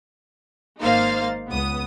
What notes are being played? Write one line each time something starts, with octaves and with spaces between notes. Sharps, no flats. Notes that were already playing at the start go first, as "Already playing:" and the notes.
G#1 A#3 D#4 C5 F5 A6
C#2 B3 D#6